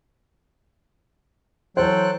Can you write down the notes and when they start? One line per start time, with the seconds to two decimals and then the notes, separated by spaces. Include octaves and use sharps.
1.77 E3 F#3 A4 C5 G5 F#6